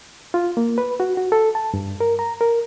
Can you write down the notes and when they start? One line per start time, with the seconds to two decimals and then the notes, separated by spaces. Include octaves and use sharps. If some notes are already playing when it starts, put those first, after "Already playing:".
0.34 F4
0.57 A#3
0.78 B4
1.00 F#4
1.17 F#4
1.32 A4
1.55 A5
1.74 G2
2.01 A#4
2.19 A#5
2.41 A#4